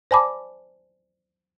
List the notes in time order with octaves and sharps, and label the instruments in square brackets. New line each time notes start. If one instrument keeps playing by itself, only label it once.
[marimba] C5 D5 G#5 A5 B5 D6